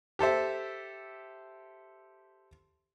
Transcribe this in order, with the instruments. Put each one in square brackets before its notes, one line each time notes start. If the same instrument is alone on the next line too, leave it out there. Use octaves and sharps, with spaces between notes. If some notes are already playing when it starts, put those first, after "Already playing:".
[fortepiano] G4 A4 C5 E5